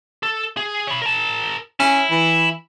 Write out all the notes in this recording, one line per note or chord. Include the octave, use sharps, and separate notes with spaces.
A4
G#4
C#5 B5
A#4 A5
C#4 E4
E3